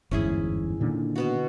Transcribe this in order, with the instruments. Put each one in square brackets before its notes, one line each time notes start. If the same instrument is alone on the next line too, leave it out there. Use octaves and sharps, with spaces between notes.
[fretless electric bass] G1 E2 G#2 [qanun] C#4 E4 G#4
[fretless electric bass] A#2 D3 D#3
[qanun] B2 B3 F#4